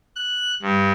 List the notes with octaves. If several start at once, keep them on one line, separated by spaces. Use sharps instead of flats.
F#6
G2